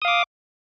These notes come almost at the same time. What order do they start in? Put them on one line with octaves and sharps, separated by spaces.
D#6 F5 D6